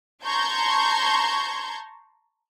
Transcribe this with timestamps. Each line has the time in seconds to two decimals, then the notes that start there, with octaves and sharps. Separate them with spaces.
0.24 A5 A#5 C6 C#6 G6 G#6